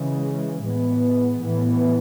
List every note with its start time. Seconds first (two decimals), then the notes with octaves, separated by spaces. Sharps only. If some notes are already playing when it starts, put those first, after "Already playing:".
Already playing: C#3 E3 G#3
0.63 A2 E3 G#3 B3
1.41 A2 E3 B3